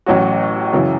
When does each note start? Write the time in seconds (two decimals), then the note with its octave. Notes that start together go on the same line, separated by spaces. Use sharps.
0.06 A1 A2 F#3 C#4 F#4
0.73 F#2 C#3 E3